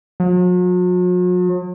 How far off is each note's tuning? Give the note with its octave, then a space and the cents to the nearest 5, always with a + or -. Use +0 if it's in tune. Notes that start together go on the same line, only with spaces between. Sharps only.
F#3 -45